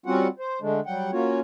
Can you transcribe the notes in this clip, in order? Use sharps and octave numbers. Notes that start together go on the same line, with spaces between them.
G3 C4 C#4 F4 F#4 F#5
C5
D3 G#3 A3 D4
F#3 G3 F#5 G5
A#3 C#4 F4 F#4 C#5